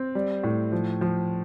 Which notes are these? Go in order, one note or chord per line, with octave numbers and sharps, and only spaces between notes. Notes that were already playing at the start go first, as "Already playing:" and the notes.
Already playing: C4
G3
A2
F3
F3